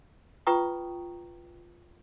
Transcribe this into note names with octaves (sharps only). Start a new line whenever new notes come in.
F4 B4 G5 A#5 C#6 D#6